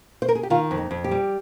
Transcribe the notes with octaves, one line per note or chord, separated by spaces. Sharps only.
C5
A#4
G#4
G4
D#3 F4
F2
D#4
F2
G4
G3